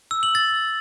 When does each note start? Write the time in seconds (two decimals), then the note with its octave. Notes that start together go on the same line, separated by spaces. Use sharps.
0.11 E6
0.23 F#7
0.35 A6